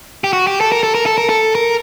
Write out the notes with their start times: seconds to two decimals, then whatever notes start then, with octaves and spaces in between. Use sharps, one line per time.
0.24 G4
0.33 F#4
0.47 G4
0.61 A4
0.72 A#4
0.83 A4
0.95 A#4
1.06 A4
1.18 A#4
1.29 A4
1.55 A#4